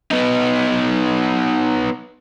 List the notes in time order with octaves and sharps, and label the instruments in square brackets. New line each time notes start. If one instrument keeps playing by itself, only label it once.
[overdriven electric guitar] B3 D#4